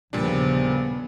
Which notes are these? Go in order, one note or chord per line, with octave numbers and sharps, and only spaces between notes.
D#2 A#2 C#3 F3 G3 B3 D4